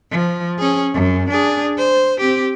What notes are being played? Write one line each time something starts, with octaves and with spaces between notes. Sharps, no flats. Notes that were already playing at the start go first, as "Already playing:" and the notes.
F3
C#4 G#4
F#2
D4 G#4
C5
C4 G4